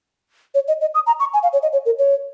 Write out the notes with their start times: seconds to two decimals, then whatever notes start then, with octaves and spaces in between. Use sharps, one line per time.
0.55 C#5
0.68 D#5
0.81 D#5
0.95 D#6
1.07 A#5
1.20 C#6
1.34 G#5
1.43 F5
1.53 C#5
1.63 D#5
1.73 C#5
1.86 A#4
1.99 C#5